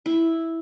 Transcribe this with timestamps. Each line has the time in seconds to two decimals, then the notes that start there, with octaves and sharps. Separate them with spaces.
0.06 E4